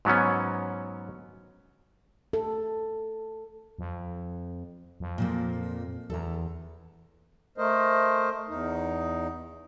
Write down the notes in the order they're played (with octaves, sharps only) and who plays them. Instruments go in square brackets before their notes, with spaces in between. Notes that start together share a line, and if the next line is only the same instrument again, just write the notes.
[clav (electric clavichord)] G#2 F#3 B3 C#4
[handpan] A4
[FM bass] F2
F2
[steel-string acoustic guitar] A#2 F3 A#3
[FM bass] E2 [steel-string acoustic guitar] A4 A#5
[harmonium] A3 A#4 C5 D#5
E2 D#4